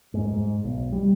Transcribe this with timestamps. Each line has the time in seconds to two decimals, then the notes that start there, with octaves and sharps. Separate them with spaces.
0.14 G#2
0.33 G#2
0.64 B1
0.92 G3